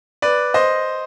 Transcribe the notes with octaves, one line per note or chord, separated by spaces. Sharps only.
B4 D5
C5 D#5